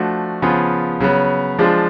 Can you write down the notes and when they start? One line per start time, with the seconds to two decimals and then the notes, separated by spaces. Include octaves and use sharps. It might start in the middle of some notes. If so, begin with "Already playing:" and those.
Already playing: F3 A3 D4 F#4
0.42 C#3 F3 B3 F4 G#4
1.00 C#3 F#3 B3
1.59 F3 G#3 D4 F4